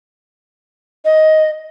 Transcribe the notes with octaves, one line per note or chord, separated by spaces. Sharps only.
D#5